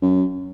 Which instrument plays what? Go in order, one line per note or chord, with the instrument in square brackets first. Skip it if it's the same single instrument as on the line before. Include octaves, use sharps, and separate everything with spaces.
[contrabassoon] F#2